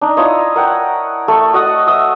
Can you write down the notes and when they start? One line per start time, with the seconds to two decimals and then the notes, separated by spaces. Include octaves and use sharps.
0.01 D4 D#4
0.17 E4 F4 C#5 D#5
0.56 A#4 F#5 G5
1.28 A3 A4 C#6
1.53 F#4 D#5 F#5 D#6
1.87 E5 D#6 E6